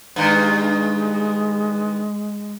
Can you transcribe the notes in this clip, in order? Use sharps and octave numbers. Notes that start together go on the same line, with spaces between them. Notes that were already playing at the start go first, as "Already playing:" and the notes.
G2 D#3 G#3